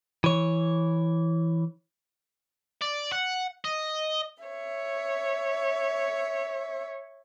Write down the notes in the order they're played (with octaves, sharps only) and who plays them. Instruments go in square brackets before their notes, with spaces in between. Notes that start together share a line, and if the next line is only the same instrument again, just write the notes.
[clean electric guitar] E3 C#5
[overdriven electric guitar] D5
F#5
D#5
[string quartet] C#5 E5